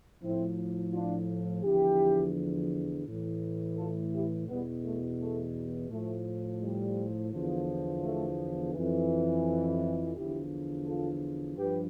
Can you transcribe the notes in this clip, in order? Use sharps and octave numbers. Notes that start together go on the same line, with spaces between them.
A2 F3 C4 E4
D4 F4
E2 D3 F3 E4 G4
A2 E3
F4 A4
E4 G4
E2 B2 G3 B3
A3
A3
A2 F3 A3
G3
E2 D3 F3
A3
F2 E3
E2 D3 F3 E4 G4
F4 A4
G2 F3 G4 B4